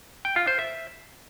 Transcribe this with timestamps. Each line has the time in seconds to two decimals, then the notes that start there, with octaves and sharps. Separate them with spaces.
0.25 G5
0.36 F4
0.47 C5
0.59 E5